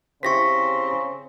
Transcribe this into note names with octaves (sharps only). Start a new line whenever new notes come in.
C#3 C4 E4 G4 C5 C#6 A#6 B6